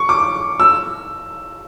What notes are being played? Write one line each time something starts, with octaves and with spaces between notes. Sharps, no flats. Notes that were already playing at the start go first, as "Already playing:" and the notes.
Already playing: C#6
D6
E6